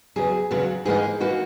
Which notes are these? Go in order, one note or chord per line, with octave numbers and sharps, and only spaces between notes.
E2 C#3 F#3 G#4
E2 C#3 F#3
G#2 E3 A#3 D#4 G#4
E3 A#3 D#4 F#4